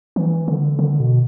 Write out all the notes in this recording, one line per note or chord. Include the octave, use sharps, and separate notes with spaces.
E3
D3
D3
B2